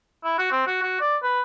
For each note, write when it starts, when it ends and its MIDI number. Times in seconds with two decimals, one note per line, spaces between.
0.24 0.34 64
0.39 0.50 66
0.52 0.64 60
0.67 0.80 66
0.83 0.98 66
1.00 1.17 74
1.23 1.42 71